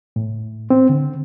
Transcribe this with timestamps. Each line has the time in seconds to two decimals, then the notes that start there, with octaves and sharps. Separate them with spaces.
0.16 A2
0.70 C4
0.89 D3